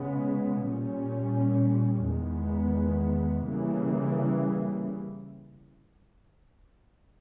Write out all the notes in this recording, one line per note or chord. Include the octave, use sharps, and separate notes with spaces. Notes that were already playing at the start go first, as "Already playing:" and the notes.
Already playing: C#3 G#3 B3
A#2 G3 C#4
E2 D#3 G#3 B3
C#3 E3 G3 A#3